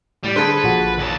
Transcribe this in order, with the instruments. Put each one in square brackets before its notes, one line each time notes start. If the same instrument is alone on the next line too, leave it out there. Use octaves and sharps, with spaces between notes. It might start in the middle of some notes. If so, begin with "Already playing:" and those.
[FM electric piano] A2 [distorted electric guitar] G3
[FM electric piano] D3 [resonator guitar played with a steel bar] G#4 A4 C5 [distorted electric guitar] B4
[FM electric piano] A#1 F3 F#4
[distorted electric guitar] D#2 A5